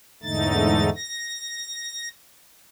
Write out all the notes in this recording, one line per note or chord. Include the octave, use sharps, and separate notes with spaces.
E2 G#2 D3 A3 D#4 A6
A#6